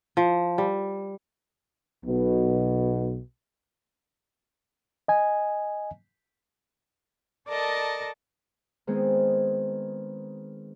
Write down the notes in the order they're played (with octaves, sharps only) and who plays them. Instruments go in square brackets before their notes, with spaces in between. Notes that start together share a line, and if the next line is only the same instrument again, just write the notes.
[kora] F3
G3
[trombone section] B1 B2
[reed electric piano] D#5 G#5
[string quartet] A4 A#4 D5 D#5 A5
[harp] D#3 G#3 B3 C4 G#4